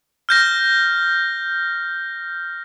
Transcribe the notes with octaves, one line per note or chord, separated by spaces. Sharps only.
F6 G6 A#6